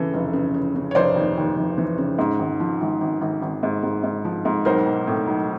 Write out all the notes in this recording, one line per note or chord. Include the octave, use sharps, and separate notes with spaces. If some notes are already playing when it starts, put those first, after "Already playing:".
Already playing: C#3 E3 A4
F1
C#3
C#3
C#3
C#5
F1 C5 D5
D#2
D#2
F1
E3
C#3
G#2
G#1
F3
G#1
G#1
G#1
G#1
G#2
G#2
G#2
F3
G#2
B1 A#4 C5
B1
A2
B1